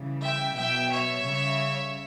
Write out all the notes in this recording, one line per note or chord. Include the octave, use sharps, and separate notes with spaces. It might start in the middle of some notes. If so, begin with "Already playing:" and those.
Already playing: C#3 E3 G3
E5 G5
B2 F#3 E5 G5
C#5 E5
C#3 G3